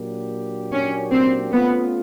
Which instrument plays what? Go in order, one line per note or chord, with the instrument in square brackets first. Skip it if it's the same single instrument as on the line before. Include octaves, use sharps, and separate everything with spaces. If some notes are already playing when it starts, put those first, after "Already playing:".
Already playing: [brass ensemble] A#2 F#3 A#3 D4 G4
[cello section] C#4
C4
[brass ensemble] A3 C#4 F4 [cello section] B3